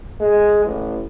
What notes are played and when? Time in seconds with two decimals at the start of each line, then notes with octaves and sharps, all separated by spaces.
0.20 G#3
0.64 A1